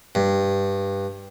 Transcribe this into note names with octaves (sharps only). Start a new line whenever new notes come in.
G2